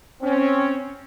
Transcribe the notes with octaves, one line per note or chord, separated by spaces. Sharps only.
C4 C#4